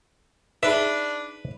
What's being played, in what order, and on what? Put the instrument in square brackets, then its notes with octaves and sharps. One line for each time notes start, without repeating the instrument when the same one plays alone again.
[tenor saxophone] D4 [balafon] D#4 G#4 [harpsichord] B4 [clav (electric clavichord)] E5